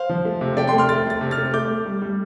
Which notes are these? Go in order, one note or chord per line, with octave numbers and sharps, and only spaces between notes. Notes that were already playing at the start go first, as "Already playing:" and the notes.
Already playing: C5 F5
F3
A3
C3
A3 D5 G5
G5 C6
A3
C6 F6
A3 A6
A3 A6
C3
F6 A6
A3
A3 D6 G6
A3
G3
G3